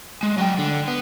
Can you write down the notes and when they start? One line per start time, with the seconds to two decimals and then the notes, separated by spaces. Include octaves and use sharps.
0.23 G#3
0.38 F#3 G5
0.59 D3
0.88 B3